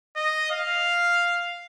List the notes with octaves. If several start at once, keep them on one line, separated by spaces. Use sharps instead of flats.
D#5
F5